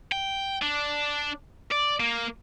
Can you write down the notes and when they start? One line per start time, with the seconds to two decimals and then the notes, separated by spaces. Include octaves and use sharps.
0.12 G5
0.62 D4
1.72 D5
2.00 A#3